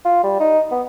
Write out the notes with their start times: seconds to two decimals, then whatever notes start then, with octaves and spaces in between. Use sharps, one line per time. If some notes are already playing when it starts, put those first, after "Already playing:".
0.05 F4
0.23 G3
0.40 D#4
0.72 B3